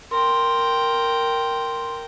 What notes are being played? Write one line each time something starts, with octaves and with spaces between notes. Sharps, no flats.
A#4 G5 C6